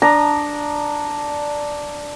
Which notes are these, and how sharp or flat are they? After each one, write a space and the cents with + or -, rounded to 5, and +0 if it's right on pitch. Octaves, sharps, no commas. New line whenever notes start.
D4 +0 A#5 +0 D#6 -25